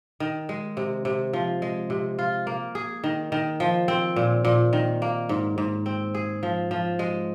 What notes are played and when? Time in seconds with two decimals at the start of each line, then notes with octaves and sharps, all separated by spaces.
0.20 D#3
0.49 G#3
0.77 C3
1.05 C3
1.33 F3
1.62 G#3
1.90 C3
2.19 F4
2.47 A#3
2.75 G#4
3.04 D#3
3.32 D#3
3.60 F3
3.88 C4
4.16 A#2
4.45 A#2
4.73 D#3
5.02 A#3
5.29 G#2
5.58 G#2
5.86 C4
6.15 G#4
6.43 F3
6.71 F3
6.99 G#3